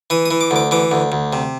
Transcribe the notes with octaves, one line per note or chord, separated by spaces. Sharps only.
E3 D#6
D#6
E3
D6
D2 D6
E3 D6
D2
D2
C3